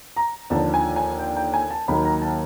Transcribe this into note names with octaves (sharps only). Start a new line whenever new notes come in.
A#5
D#2 D3 F3 A5
G#5
G#5
G5
G5
G#5
A5
D#2 D#3 F#3 A#3 B5
A#5
A5